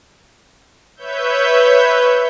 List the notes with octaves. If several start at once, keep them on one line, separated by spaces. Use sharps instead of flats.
B4 C#5 E5 G6